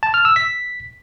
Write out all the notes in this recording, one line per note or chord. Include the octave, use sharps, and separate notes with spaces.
A5
F6
E6
B6